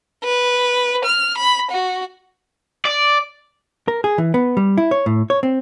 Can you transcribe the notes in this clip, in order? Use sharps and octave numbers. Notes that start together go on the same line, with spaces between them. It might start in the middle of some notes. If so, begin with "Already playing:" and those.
B4
F6
B5
F#4
D5
A#4
G#4
E3
B3
G3
E4
C#5
A2
C#5
C4